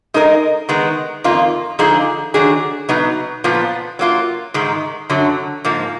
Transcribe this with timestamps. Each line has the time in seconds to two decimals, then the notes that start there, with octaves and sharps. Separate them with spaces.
0.14 G#3 D#4 A#4 D#5
0.69 D#3 G#3 B3
1.24 F2 D#3 A#3 F4
1.79 D3 F3 G#3 D#4 G#4
2.34 D#3 F#3 D4 G#4
2.89 B2 F#3 B3 D#4
3.44 A#2 F3 B3 F4
3.99 F#3 A#3 F4
4.54 G#2 D#3 G#3
5.10 F#2 D3 F#3
5.65 G#2 F3 A#3